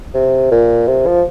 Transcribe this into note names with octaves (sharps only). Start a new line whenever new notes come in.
C3
A#2
C3
F3